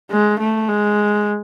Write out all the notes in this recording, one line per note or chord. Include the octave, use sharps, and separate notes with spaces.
G#3
A3
G#3